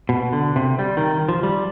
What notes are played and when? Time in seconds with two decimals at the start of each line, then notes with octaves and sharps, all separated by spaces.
0.09 B2
0.33 D3
0.56 C3
0.79 G3
0.97 D#3
1.29 F3
1.43 G3